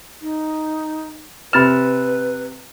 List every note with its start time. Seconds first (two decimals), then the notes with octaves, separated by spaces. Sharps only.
0.22 D#4
1.53 C3 B4 B5 F6 A6 E7